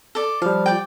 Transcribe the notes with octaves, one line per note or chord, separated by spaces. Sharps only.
A4 D5
F3 G3 F5
D5 G5